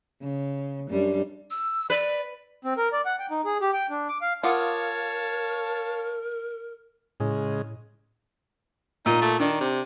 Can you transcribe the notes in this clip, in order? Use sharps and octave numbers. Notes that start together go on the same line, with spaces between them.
C#3
F#2 G3 D4
E6
B4 D5
C4
A#4
D5
F#5
G5
D#4
G#4
G4
G5
D4
D6
F5
F4 A#4 C#5 F5 F#5 A5 D6 D#6
A2 C#3 G#3
A#2 D#4
A3
D#3 D4
C3